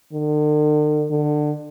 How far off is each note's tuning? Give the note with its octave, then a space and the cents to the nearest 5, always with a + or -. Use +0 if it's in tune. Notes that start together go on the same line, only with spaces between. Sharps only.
D3 +45
D3 +25